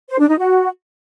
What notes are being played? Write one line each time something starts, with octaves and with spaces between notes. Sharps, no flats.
C5
D4
D#4
F#4